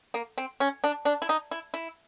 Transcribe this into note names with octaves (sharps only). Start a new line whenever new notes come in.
A#3
C4
C#4
D4
D4
E4
D#4
E4
E4